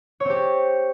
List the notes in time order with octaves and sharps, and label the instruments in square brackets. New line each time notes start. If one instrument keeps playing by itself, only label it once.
[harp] C#5
C4
G4